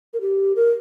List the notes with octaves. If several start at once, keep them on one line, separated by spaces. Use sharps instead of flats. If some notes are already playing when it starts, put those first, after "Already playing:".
A#4
G4
A#4